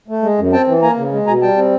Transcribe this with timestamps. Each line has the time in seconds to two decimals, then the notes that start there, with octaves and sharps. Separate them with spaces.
0.08 A3
0.23 G#3
0.38 F#2
0.53 C4 G5 A5
0.67 E3
0.82 A#3 G#5 A#5
0.97 C#3
1.12 G#3
1.27 B2 G#5 A#5
1.42 G3 G5 A5
1.57 C4